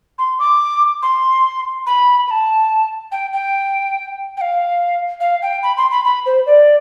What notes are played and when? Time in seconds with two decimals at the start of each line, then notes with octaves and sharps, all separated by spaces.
0.19 C6
0.39 D6
1.02 C6
1.87 B5
2.28 B5
2.31 A5
3.12 G5
3.33 G5
4.37 G5
4.41 F5
5.20 F5
5.42 G5
5.63 B5
5.77 C6
5.91 B5
6.05 B5
6.26 C5
6.46 D5